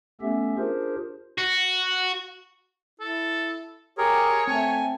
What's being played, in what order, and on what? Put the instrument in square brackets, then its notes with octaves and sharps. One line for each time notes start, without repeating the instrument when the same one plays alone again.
[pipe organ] A3 B3 C#4 G4 A4 E5
D4 F4 G4 G#4 A#4 C5
[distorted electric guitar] F#4
[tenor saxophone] E4 [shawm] A4
[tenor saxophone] G4 [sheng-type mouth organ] G#4 A#4 [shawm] C#5
[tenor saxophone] A3 [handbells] C4 A5 [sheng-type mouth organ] G#5